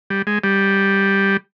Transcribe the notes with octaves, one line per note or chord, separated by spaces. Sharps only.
G3
G#3
G3